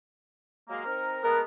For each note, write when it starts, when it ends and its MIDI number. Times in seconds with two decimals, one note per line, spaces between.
0.68 0.82 54
0.68 0.82 56
0.68 0.82 58
0.83 1.19 60
0.83 1.19 63
0.83 1.19 70
1.24 1.42 56
1.24 1.42 57
1.24 1.42 59
1.24 1.41 70